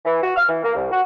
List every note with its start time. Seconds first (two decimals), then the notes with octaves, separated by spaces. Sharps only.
0.05 E3
0.23 F#4
0.36 F6
0.49 E3
0.64 A#3
0.75 C2
0.91 F#4